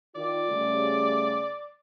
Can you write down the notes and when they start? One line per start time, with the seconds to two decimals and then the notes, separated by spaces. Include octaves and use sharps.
0.15 D#3 F4 D5
0.49 C#3 G3 A3